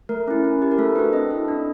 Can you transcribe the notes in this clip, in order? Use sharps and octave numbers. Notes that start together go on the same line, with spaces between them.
A3 A#4
C#4 E4
C#4
E4 G4
A#4
A3 A4
D4 F#4 A4 B4
C4 D#5
E4 A4
D4